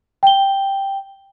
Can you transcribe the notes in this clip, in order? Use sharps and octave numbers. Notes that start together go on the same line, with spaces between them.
G5 G7